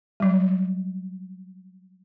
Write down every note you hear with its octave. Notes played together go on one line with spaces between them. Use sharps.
F#3 G3